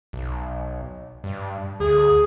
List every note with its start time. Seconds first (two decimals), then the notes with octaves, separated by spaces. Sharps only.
0.13 B1
1.24 G2
1.80 D2 G#4